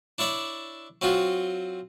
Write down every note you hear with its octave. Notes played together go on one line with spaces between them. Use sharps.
D4 E4 C#5 D5 E5
F#3 C4 F4 F#4